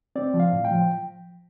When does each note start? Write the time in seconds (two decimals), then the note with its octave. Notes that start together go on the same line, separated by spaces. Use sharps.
0.16 C4 D5
0.34 F3
0.40 F5
0.52 A2
0.65 G5
0.71 F3